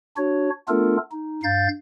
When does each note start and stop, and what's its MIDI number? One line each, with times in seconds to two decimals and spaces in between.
0.17 0.50 62
0.17 0.50 66
0.17 0.50 73
0.68 0.97 57
0.68 0.97 59
0.68 0.97 62
0.68 0.97 65
0.68 0.97 69
0.68 0.97 70
1.11 1.43 63
1.43 1.68 43
1.43 1.68 77
1.43 1.68 91
1.43 1.68 93